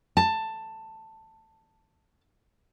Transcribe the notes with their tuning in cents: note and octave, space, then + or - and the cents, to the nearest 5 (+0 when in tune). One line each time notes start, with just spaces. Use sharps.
A5 +10